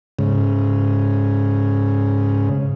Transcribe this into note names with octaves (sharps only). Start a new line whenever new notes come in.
G#2 C#3